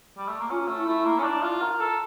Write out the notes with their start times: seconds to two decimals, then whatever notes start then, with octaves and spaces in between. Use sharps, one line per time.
0.18 G3
0.28 A3
0.40 A#3
0.50 C#4 F4
0.68 A3
0.78 E4
0.87 A3
1.05 A#3
1.19 C#4
1.24 D4
1.42 F4
1.61 A#4
1.80 A4